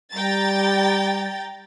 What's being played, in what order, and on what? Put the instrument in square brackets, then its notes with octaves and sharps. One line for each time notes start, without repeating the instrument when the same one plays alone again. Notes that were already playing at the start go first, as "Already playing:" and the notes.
[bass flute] G3 [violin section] G5 A#5 A6